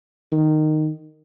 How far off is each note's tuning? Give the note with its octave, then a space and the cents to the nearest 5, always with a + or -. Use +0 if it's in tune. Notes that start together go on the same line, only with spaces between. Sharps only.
D#3 -10